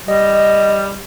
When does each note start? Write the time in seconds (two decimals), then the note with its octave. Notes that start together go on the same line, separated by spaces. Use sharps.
0.08 G3 D#5
0.35 D#5